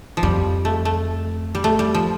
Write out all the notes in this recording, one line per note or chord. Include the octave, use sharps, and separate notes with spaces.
F3
F2 G3
A3
A3
G3
A3
G3
F3